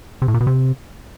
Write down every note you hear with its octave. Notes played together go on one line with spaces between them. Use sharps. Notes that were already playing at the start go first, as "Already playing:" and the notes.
C3
A2
A#2
B2
C3